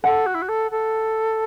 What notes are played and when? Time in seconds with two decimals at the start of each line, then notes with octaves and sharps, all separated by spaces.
0.03 A4 F#5
0.26 F#4
0.34 E4
0.42 F#4
0.48 A4
0.71 A4